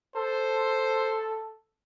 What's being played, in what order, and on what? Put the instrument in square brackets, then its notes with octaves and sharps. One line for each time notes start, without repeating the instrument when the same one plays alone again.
[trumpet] A4 [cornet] C5